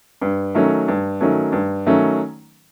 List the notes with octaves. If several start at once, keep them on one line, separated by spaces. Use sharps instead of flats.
G2
D#3 F#3 A3 C#4
G2
D#3 F#3 A3 C#4
G2
D#3 F#3 A3 C#4